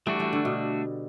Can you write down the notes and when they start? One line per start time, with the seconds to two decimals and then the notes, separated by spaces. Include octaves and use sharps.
0.06 E3 G3 A3 D4 F#4
0.19 E3 G3
0.33 D3
0.45 B2